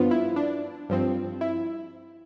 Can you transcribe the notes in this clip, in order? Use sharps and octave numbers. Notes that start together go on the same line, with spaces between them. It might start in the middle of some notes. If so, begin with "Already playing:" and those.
Already playing: G2 F3 B3 F4
E4
D4
G2 F3 C4
E4